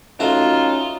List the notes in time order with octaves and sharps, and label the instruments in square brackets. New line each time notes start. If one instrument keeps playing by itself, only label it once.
[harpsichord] A3 F#4 [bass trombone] C#4 [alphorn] D#4 [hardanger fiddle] F4